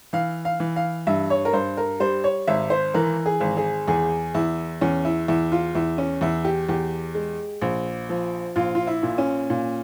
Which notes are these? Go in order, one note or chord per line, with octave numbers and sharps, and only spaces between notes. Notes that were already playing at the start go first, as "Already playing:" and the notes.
E3 F5
F5
E3
F5
G2 E5
C#5
A#4
G2 C5
A#4
G3 C5
C#5
G#1 E5
C5
E3 A#4
G#4
G#1
G#4
E2 G#4
E2 E4
E2 C#4
E4
E2 E4
F4
E2 E4
C#4
E2 E4
G4
E2 G4
G#3
A#1
F3
A#1 F4
F4
E4
A#2
C#4
A#2